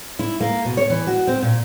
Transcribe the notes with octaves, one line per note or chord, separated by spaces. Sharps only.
E4
A#3
B2
C#5
E3
F#4
C4
A#2